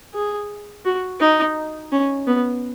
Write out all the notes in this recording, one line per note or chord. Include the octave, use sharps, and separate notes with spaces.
G#4
F#4
D#4
C#4
B3